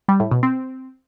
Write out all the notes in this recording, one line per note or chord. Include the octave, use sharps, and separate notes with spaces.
G3
A2
B2
C4